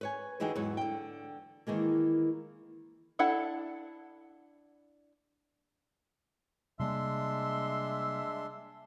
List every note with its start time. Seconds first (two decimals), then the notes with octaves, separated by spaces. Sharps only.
0.01 B4 C#5 G#5
0.40 D3 E3 D#4 F#4 G#4 G5
0.55 E2 G#2 F#3 B3 C#5
0.77 D3 G5
1.67 D#3 E3 G#3 A#3
3.19 D4 E4 A4 F#5
6.79 C3 G3 G#3 A#3 D4 E5 C6